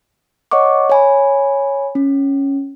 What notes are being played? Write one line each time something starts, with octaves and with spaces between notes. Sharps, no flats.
C#5 D#5 F#5 C#6 D6
C#5 G#5 B5
C#4